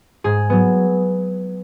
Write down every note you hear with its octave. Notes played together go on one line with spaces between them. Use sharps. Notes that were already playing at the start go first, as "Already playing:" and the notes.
G#2 G#4
F#3 B3